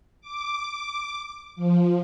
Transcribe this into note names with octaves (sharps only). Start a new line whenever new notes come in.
D6
F3